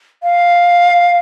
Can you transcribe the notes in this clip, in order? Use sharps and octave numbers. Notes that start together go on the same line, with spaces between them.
F5